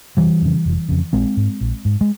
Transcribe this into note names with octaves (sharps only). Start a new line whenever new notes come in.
F1 E3 G3
F2 C#3
F1
F2 C#3
A#1 G#3 C4
G#2
A#1
G#2
G#3